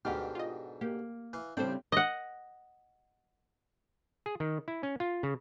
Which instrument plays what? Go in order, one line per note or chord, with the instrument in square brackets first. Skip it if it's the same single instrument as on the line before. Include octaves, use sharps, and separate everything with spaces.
[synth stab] D2 B3 F6 [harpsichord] G#2 B2 D3 [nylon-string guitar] G4
[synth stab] F4 D#5
[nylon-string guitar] A#3 [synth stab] G4
[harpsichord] E3 F5
[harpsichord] A1 G5 [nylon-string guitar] C#3 G3 C4 [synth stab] D4 A4 C5
[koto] D#5 F#5
[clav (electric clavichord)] G#4
D#3
E4
C#4
F4
C#3